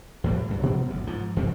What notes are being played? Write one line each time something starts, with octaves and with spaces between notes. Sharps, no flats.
E2 A2 G3
C#2 G2
B2 F#3 B3 C4
G#1 D2
G#2 F3
E2 G2 C3 C4